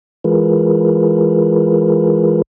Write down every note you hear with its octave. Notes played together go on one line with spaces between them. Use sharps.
E3 G#3 F4 G#4 A#4 B4